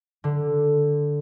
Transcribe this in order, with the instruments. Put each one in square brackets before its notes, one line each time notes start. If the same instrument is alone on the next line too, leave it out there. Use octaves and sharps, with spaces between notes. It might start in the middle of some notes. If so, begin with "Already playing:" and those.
[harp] D3